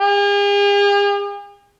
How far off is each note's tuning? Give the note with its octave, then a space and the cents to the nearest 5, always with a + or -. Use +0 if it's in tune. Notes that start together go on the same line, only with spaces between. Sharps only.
G#4 -45